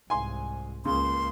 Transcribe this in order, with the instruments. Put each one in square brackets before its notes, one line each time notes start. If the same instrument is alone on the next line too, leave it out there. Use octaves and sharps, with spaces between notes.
[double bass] C2 G#2 [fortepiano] G#5 C6
[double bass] C#2 A#3 [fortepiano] C#3 [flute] C6